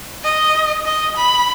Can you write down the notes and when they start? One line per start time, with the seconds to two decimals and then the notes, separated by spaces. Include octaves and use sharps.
0.24 D#5
0.86 D#5
1.17 B5